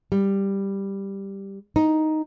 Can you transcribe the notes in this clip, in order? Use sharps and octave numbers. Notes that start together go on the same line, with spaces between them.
G3
D#4